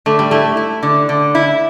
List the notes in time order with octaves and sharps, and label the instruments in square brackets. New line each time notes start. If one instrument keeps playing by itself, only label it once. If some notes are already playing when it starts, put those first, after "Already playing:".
[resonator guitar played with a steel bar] D3 [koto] A3
[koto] G3
[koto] A3 [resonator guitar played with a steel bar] E4
[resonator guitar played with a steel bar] E4
D3
D3
E4